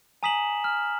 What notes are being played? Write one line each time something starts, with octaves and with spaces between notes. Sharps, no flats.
G#5 A#5 D#6 B6 E7 F#7
F6